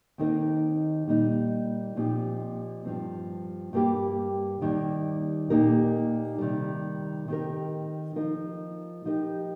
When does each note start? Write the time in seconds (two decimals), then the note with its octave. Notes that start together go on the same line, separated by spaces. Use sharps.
0.18 D#2 D#3 C4 D#4 A#4
1.08 A#2 G3 A#3 D#4
1.96 A#2 F3 C4 D#4 G4
2.85 G2 F3 C4
3.73 G2 G3 A#3 G4
4.61 D#2 D#3 G3 A#3
5.50 A#2 A#3 D#4 G4 A#4
6.38 C3 D#3 G3
7.28 D#3 C4 G4 A#4
8.16 F3 D#4 A#4
9.05 F3 D#4 G4 A#4